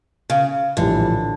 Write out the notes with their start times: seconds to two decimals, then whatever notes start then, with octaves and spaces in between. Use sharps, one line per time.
0.30 C#3
0.77 A#1 A2 D3 E3 G3